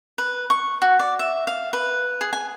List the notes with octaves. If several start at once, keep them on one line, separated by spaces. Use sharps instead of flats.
B4
C#6
F#4
D5
E5
F5
B4
G#4
G#5